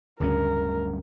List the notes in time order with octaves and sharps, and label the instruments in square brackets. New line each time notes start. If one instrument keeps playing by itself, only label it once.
[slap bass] D1 G2 C#4 [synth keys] D2 C#3 [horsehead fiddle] A#4